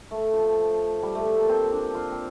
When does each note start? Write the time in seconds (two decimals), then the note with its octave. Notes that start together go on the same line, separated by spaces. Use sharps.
0.11 A3
0.33 F3
1.02 G3
1.15 A3
1.25 F3
1.38 A#3
1.49 C4
1.72 D4
1.95 F4
2.12 C4